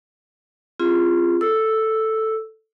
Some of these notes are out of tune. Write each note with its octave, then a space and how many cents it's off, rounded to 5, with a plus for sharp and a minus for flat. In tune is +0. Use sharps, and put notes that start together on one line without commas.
C4 +10 F4 -20 G#4 -30
A4 +5 E6 +0